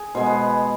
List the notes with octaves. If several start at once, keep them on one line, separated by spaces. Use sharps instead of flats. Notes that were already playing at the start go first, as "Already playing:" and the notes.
Already playing: G#4
B2 G#3 C5
B4